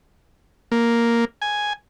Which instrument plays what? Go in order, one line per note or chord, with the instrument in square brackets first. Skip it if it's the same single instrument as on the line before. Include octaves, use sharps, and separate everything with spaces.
[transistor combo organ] A#3
G#5